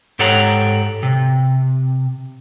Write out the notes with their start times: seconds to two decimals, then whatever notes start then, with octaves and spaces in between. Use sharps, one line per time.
0.19 G#2 G4 A4 C#5 F#5 A#5
1.03 C3